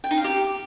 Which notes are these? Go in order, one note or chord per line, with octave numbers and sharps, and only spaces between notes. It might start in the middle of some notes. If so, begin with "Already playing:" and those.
G5
D#4
F5
G4